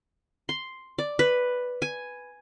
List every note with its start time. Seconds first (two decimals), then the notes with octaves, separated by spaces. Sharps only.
0.49 C6
0.98 D5
1.19 B4
1.82 G#5